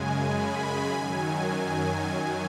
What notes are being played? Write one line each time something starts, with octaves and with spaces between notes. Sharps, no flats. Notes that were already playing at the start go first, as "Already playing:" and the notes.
Already playing: F#2 C#3 G#3 G#5
B5
F#2 D#3 F#3 G#5